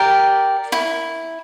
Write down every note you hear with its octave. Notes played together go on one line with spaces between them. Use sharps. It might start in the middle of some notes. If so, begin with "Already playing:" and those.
Already playing: G4 A#4 D5
E4